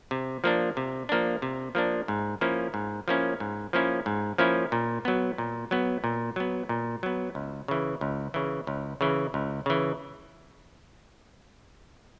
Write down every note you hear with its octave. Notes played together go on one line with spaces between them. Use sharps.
C3
F3 A#3 D4
C3
F3 A#3 D4
C3
F3 A#3 D4
G#2
F3 A#3 C#4 E4
G#2
F3 A#3 C#4 E4
G#2
F3 A#3 C#4 E4
G#2
F3 A#3 C#4 E4
A#2
F#3 B3
A#2
F#3 B3
A#2
F#3 B3
A#2
F#3 B3
C#2
C#3 E3
C#2
C#3 E3
C#2
C#3 E3
C#2
C#3 E3